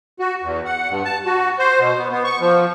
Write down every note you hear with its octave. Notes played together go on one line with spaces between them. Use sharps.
F#4
E2
F#5
G2
A5
F#4
C5
B2
B3
B3
C#6
F3